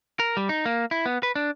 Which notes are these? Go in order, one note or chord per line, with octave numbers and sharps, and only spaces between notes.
A#4
G3
D#4
A#3
E4
B3
B4
D4